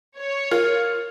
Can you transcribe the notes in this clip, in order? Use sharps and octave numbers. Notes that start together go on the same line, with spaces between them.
C#5
F4 A#4